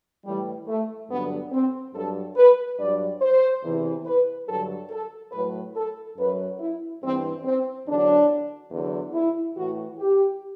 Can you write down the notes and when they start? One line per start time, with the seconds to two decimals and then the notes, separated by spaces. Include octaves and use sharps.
0.25 A2 E3 G3
0.67 A3
1.10 G2 D3 F#3 B3
1.52 C4
1.94 G2 F#3 A4
2.37 B4
2.79 G2 F#3 D5
3.21 C5
3.64 E2 C3 E3
4.06 B4
4.48 G2 D3 F#3 A4
4.90 A4
5.32 A2 F#3 B4
5.75 A4
6.17 F#2 F#3 B4
6.60 E4
7.02 G2 E3 C4
7.44 C4
7.86 E2 D3 F#3 D4
8.71 E2 D3 F#3
9.14 E4
9.56 A2 E3 F#4
9.98 G4